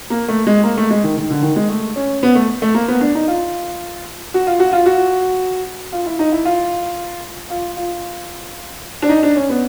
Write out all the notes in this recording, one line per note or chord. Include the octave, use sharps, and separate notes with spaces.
A#3
A3
G#3
A#3
A3
G#3
D#3
D#3
D3
D#3
G#3
A3
C#4
B3
A3
A3
A#3
B3
D4
D#4
F4
F#4
F4
F#4
F4
F#4
F4
E4
D#4
E4
F4
F4
F4
D4
D#4
D4
C#4
B3